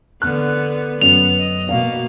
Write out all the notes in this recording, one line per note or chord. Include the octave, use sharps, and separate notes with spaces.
D3 B3 F#6
F#2 B3 F7
D#5
B2 A#3 F5